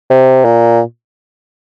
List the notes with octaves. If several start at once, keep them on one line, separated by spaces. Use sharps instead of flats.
C3
A#2